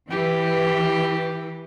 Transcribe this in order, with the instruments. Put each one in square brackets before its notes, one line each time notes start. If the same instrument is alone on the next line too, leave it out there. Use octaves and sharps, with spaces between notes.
[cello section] E3 [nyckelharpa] G4